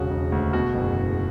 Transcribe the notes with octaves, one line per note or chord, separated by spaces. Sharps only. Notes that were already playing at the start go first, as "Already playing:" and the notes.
Already playing: E1 C#3 F#4
E1
D2
B2 F#4
F#1
F#1